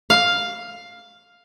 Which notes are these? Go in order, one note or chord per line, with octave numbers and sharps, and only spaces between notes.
F5